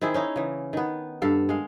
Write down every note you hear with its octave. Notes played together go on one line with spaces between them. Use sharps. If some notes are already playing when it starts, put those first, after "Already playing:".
D#3 C4 E4 G#4
C#4 D#4 E4
C#3 E3
D#3 B3
G2 A4 F5
G#3 F5